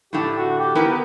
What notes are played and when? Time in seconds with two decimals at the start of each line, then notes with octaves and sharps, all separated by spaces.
0.13 A2 D3 A3 G4
0.38 F#4
0.58 G4
0.75 B3 E4 G4 A#4